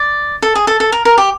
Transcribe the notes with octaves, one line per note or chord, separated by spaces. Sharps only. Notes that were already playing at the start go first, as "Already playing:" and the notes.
Already playing: D5
A4
G#4
A4
A4
A#4
A#4
G4